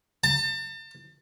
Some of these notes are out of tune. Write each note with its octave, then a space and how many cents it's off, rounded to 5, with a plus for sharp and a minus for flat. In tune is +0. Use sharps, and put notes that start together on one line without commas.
A5 +35